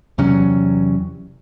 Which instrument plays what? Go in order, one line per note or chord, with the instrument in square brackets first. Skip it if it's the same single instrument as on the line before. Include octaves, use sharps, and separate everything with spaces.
[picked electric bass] E2 C3 F#3 C#4